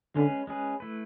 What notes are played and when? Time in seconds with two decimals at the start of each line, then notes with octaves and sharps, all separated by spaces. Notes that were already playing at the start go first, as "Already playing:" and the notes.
0.16 D3 G#3 C#4 G#4 B4
0.47 G#3 C#4 G#4 B4
0.80 A3 E4 B4